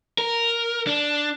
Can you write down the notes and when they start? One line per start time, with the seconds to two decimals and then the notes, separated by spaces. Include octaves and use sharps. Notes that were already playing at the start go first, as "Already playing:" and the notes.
0.18 A#4
0.87 D4